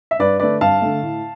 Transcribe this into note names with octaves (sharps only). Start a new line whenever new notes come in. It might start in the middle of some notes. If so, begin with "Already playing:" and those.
E5
G2 B4 D5
D3 A3 B4 D5
G2 F5 A5
D3 A3
A2